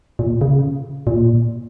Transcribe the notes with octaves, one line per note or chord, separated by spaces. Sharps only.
A#2
C#3
A#2